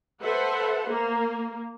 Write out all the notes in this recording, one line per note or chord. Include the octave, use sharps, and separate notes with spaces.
A4 B4 C5 E5 F#5
A#3